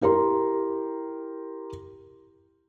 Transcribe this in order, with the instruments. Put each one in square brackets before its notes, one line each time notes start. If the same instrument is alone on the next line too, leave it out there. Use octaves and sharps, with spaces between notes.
[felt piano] E4 G4 A#4 A#5 C6